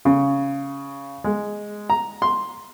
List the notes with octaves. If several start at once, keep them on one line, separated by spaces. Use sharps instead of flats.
C#3
G#3
A#5
C6